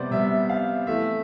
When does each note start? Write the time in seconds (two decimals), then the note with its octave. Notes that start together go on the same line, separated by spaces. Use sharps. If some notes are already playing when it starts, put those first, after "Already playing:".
Already playing: C3 G3 B3 C5 D5
0.11 C3 G3 B3 E5
0.49 F5
0.87 E3 A3 C4 E5